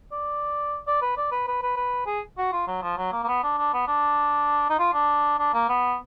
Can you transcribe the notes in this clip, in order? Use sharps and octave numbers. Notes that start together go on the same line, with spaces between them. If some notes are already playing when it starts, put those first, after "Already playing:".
D5
D5
B4
D5
B4
B4
B4
B4
G#4
F#4
F4
F#3
F3
F#3
A#3
A#3
B3
D4
D4
B3
D4
D#4
F4
D4
D4
A#3
B3